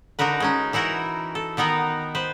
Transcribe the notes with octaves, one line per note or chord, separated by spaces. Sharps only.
D3 D#4 F#4 A#4 B4
G#3 C#4 D#4
E3 D#4 E4 F#4 A#4
A4
D#3 B3 D#4 A#4 B4
B4 C5